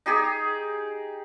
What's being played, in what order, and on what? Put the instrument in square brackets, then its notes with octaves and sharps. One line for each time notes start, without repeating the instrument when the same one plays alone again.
[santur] D#4 G4 G#4